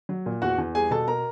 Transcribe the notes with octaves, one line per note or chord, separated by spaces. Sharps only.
F#3
A#2
E2 F#4 F#5
E2
G3 G#4 G#5
B2 A4 A5
A#4 A#5